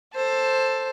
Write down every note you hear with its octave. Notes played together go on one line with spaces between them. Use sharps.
A4 C5